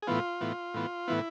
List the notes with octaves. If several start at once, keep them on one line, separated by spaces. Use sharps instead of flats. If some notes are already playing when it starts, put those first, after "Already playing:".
G#4
A2 E3 B3 F4
A2 E3 B3
A2 E3 B3
A2 E3 B3 E4